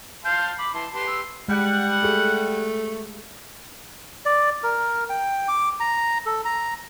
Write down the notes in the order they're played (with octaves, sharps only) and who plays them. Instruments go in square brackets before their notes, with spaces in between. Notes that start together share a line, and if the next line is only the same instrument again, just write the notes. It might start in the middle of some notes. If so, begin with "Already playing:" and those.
[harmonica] F5 A5 C6 [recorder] G6
[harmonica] B5 [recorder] D6
[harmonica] E3 C6 [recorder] A5
[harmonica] G4 B4 C6 [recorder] A5
[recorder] E6
[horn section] G3 F#5 [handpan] G#3
[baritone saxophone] A3 [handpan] G4 G#4
[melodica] D5
A#4
G5
D6
A#5
A4
A#5